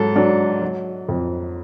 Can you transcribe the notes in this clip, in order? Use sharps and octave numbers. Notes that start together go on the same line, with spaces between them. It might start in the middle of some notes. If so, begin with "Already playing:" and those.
Already playing: G#2 F#3 A4
F#3 D4
F#3
F2